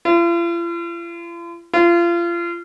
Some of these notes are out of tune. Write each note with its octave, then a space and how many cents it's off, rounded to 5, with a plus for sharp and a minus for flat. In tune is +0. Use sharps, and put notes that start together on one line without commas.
F4 -45
F4 -30